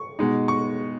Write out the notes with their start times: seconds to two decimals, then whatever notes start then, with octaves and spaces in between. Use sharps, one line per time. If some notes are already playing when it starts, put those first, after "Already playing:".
Already playing: C#6
0.19 B2 G#3 D#4
0.48 C#6